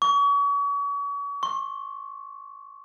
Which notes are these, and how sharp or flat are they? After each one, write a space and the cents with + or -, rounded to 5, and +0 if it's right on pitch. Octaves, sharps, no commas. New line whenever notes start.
C#6 +40
C#6 -45